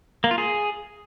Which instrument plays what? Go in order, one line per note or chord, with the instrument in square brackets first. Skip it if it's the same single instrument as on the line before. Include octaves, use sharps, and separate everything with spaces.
[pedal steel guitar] A#3
F4
G#4